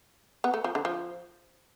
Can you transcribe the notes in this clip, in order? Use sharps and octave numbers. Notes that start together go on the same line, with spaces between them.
B3
A3
F3
D3
F3